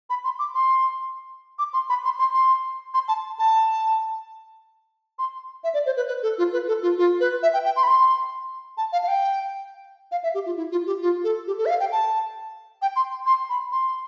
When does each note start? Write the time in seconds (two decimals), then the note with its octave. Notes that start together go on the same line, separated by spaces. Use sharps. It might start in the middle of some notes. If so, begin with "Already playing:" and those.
0.10 B5
0.24 C6
0.39 D6
0.55 C6
1.59 D6
1.73 C6
1.90 B5
2.04 C6
2.19 C6
2.34 C6
2.94 C6
3.08 A5
3.39 A5
5.19 C6
5.64 E5
5.74 D5
5.86 C5
5.97 B4
6.08 B4
6.23 A4
6.38 F4
6.53 B4
6.68 A4
6.82 F4
6.98 F4
7.20 B4
7.43 E5
7.54 G5
7.65 G5
7.76 C6
7.83 B5
7.88 C6
8.77 A5
8.93 F5
9.03 F5
9.08 G5
10.12 F5
10.23 E5
10.34 G4
10.46 F4
10.57 E4
10.72 F4
10.86 G4
11.02 F4
11.24 A4
11.47 G4
11.58 A4
11.66 E5
11.70 F5
11.80 G5
11.92 A5
12.82 G5
12.96 C6
13.26 C6
13.50 B5
13.72 C6